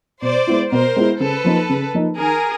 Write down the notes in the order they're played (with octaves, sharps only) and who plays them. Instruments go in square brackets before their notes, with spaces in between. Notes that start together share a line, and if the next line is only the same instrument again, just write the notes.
[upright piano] B2 [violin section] C5 D5
[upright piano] G#3 B3 E4
[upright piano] B2 [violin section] A#4 C5
[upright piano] G#3 B3 E4
[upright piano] C#3 [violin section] A4 B4
[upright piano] F3 A#3 D#4
C#3
F3 A#3 D#4
[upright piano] D#3 [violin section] G#4 A#4